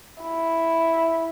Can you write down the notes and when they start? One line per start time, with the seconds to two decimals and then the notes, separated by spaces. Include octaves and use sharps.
0.22 E4